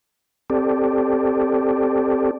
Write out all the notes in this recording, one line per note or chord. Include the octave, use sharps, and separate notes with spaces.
C4 G4 A4 D5